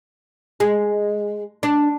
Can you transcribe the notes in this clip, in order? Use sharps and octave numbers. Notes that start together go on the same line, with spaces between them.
G#3
D4